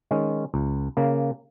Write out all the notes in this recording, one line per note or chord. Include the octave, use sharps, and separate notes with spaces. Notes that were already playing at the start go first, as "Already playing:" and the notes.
D#3 G#3 C#4
C#2
C#3 A#3